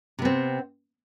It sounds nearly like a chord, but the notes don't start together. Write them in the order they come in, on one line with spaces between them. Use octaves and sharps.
C3 B3 C4